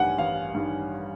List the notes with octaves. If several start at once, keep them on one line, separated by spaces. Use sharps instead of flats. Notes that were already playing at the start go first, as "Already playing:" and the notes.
Already playing: A1 G2 D#3 G3 F#5 G#5
A1 F5
G2 D#3 G3